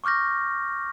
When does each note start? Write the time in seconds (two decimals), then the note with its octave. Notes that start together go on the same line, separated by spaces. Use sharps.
0.04 C#6 D6 F6 G6 A#6